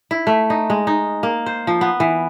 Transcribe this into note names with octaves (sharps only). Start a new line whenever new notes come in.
E4
A3
D#4
G#3
D#4
A#3
C5
F3
B3
E3